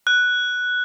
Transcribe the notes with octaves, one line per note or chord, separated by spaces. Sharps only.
F#6